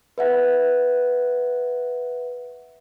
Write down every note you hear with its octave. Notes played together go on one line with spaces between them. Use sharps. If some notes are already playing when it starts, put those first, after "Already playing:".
B4 E5 F#5